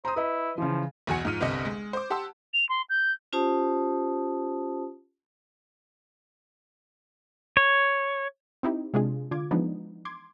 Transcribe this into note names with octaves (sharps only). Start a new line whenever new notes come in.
C5 A#5 D#6
E4 B4 D#5
C#3 E3 F3
B1 E2 F#4 G#5 C#7
G#2 F3 F6 D#7
G1 C2 C3 D#5 C#7
G#3
C5 D6
G4 F#5 A5 C6 E6
F7
C6
G6
C#4 F4 G4 C5 A5 D#6
C#5
C4 D#4 E4 G4
C3 G#3 D4 F4 G#4
D3 F4 D6 G#6
E3 F3 G#3 B3 D4 D#4
C6 D6 G#6